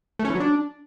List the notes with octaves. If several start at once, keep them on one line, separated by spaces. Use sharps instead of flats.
A3
C#4
E3
F#3
D4